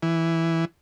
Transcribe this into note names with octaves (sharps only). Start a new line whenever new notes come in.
E3